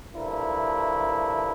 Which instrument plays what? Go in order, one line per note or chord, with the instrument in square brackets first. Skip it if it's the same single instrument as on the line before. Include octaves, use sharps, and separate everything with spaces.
[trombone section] G2 F3 A3 E4 A#4